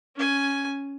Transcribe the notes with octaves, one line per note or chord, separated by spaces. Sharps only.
C#4 G#5